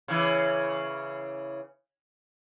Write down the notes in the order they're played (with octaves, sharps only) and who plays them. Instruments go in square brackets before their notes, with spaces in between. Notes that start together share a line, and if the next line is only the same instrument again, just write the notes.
[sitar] C#3 E3